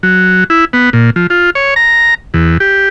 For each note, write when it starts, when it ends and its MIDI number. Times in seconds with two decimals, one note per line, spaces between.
0.03 0.44 54
0.50 0.65 64
0.73 0.90 59
0.93 1.10 46
1.16 1.27 53
1.30 1.50 65
1.55 1.74 73
1.76 2.14 82
2.34 2.57 40
2.60 2.89 67